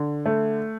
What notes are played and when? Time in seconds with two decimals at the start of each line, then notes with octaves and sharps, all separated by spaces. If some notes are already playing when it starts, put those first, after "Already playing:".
Already playing: D3
0.26 A3